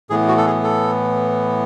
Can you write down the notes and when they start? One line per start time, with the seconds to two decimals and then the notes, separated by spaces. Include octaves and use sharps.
0.10 A2 E3 B3 G#4
0.28 F#4
0.37 A4
0.46 G#4
0.64 A4